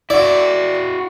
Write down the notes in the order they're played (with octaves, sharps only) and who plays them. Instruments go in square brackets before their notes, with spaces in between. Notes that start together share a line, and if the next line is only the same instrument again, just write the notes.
[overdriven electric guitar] E4 F#4 [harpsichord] D5